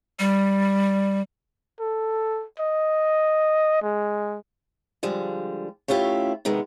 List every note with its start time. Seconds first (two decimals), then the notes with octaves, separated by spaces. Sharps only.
0.19 G3
1.80 A4
2.59 D#5
3.82 G#3
5.03 D3 F3 G3 G#3
5.88 A3 C#4 E4 F4 G4
6.45 C3 D#3 G#3 B3